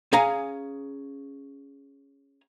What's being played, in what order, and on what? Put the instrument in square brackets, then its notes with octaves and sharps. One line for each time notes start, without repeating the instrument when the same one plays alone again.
[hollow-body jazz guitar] C#4 G#4 F5 G#5 A#5